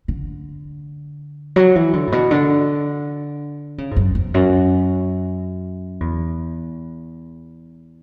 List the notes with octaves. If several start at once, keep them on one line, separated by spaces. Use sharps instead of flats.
D3
F#3
E3
D3
A2
B2
D3
C#3
G#2
F#2
E2
F#2
E2